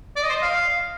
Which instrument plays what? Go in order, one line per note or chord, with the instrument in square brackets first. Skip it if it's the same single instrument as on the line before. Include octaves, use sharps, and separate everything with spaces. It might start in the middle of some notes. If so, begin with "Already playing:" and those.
[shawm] D5
D#5
C5
D#5
F5